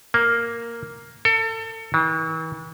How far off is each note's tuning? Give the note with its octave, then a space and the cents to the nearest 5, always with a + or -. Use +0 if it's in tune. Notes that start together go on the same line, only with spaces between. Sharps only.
A#3 +0
A4 +30
E3 -45